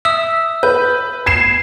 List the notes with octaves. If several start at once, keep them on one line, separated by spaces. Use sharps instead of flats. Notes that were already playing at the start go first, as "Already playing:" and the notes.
E5 D#6 E6
B4 G6
G#6 C7 E7